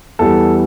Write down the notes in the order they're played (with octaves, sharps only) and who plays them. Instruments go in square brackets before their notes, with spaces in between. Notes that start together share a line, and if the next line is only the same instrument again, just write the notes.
[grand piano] E2 E3 G3 A4